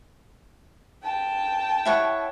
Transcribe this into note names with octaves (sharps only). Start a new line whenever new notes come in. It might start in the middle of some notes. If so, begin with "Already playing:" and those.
G5 A5
E4 C#5 F#5